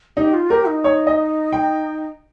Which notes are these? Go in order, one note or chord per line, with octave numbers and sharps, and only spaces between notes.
D#4 G4
F4
G4 A#4
D#4
C#5
D#5
G5